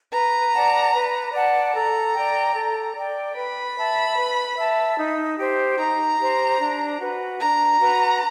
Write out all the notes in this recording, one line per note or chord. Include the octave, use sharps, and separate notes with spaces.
B4 A#5
D5 F#5 A5
B4
D5 F#5 A5
A4 A#5
D5 G5
A4
D5 G5
B4 B5
E5 A5
B4
E5 A5
D#4
G4 C5
D#4 A#5
G4 C5
D4
F#4 B4
D4 A#5
F#4 B4